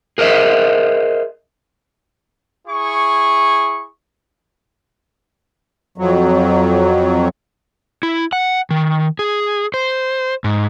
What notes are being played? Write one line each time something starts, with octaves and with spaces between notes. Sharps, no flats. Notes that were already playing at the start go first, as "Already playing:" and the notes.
G#4 A#4 C5 D#5 E5
E4 G#4 C#6
F2 F#3
E4
F#5
D#3
G#4
C5
G#2